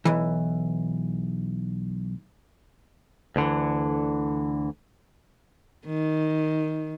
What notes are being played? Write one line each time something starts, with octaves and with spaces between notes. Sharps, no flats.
B1 E3
D2 D3 E3
D#3